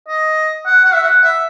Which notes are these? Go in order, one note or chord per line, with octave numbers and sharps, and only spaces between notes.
D#5
F#5
F#5
E5
F#5
E5